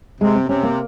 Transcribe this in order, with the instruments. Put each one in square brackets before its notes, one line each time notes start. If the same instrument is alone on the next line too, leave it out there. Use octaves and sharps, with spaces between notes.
[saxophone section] C3 [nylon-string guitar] G#3
[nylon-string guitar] C4
[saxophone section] C3 [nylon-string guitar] C#4
[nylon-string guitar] A#3